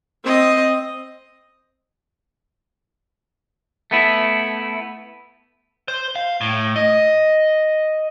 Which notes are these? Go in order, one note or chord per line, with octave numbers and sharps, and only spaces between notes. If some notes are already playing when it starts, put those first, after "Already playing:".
C4 D#5
A3 B3 E4
C5
F5
A2
D#5